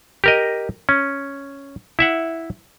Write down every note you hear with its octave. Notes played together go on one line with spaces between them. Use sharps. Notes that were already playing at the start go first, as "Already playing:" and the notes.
G4 A#4 D#5
C#4
E4 E5 F#5